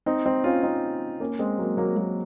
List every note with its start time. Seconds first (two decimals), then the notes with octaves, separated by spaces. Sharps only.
0.06 C4 D#4
0.25 C4 D#4
0.44 C#4 F4
0.63 C4 D#4
1.20 A#3 C#4
1.39 G#3 C4
1.58 F#3 A#3
1.77 F#3 A#3
1.96 F#3 A#3